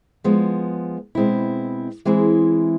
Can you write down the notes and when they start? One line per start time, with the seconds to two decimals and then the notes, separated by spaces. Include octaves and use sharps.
0.24 F3 G#3 B3
1.15 B2 G#3 C4 E4
2.05 E3 G#3 C4 E4 G#4